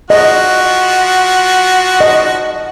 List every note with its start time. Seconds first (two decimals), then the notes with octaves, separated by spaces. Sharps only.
0.10 F3 F#4 D#5
2.01 D#5